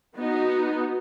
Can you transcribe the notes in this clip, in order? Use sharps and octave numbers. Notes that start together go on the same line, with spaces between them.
B3 D#4 F#4